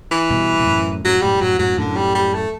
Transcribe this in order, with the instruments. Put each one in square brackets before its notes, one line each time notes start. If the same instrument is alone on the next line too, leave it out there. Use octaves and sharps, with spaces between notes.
[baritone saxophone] E3
[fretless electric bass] G2 B2
B2
F#2 A2
[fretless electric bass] F#2 A2 [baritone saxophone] F#3
[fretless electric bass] F#2 A2 [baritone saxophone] G3
[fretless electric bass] F#2 A2 [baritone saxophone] F#3
[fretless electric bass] F#2 A2 [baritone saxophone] F#3
[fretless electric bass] F#2 A2 [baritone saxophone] D3
[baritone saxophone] G3
G3
A3